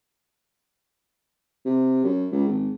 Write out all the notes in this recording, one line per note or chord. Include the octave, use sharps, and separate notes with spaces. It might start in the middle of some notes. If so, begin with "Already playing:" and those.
C3
F#2
C#2
G#1